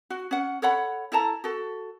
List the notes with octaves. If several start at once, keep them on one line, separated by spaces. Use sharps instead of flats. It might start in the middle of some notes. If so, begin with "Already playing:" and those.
F#4
C#4 F#5
A4 C#5 F#5 B5
E4 A4 A5 A#5
F#4 A4